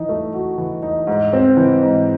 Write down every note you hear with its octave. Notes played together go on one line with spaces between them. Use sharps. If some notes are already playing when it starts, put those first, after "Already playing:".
Already playing: E3 D#4
A3
F#4
E3
D#4
G#2
C4
E3
G#2